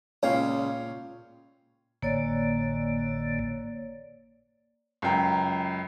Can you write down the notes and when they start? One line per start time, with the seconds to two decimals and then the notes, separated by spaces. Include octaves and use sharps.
0.23 C#2 A#2 C#5 F5 G5 D#6
2.03 G#1 A2 D3 A#3 C#5 D5
5.02 C#2 F#2 G5 A#5